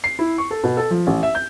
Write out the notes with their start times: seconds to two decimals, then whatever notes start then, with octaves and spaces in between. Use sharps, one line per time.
0.04 C7
0.19 E4
0.38 C#6
0.51 A4
0.64 B2
0.77 A4
0.91 F3
1.07 A1
1.23 E5
1.35 G6